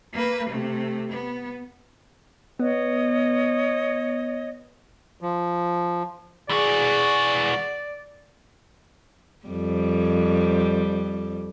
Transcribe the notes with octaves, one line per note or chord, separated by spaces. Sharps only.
A#3 B4
C3 A3
B3
B3 C#5 D#5
F3
E3 F#4 G#4 D5
F2 G3